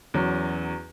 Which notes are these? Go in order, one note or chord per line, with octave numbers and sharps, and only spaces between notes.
E2 F#3 C#4